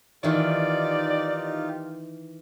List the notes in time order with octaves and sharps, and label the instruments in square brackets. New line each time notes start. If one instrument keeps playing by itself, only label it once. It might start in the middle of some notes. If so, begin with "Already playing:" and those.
[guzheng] D#3 E3 [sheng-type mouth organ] D#4 F4 G4 [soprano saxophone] D5